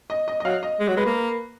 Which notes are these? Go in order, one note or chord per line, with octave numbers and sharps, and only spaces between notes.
D#5
D#5
D#5
F#3 F5
D#5
G#3
F#3
G#3 B4
A#3